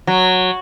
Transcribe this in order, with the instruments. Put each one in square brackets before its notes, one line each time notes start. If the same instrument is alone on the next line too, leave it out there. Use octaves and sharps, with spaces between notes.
[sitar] F#3